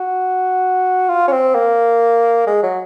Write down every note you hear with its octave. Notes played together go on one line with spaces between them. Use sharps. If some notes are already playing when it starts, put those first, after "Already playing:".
Already playing: F#4
F4
C#4
C4
A#3
G#3
F#3